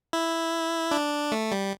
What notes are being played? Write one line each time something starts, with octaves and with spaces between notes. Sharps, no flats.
E4
D4
A3
G3